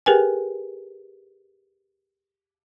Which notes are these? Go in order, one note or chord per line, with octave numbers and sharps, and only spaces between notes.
G4 G#4 A#4 B4 G5 G#5